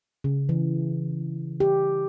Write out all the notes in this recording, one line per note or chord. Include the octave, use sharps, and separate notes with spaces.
C#3
E3
G4